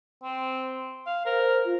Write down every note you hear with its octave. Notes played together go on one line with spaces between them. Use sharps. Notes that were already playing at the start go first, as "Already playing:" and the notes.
C4
F5
A#4 C5
F4